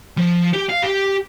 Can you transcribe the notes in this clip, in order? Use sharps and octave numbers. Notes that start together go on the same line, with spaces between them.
F3
G4
F5
G4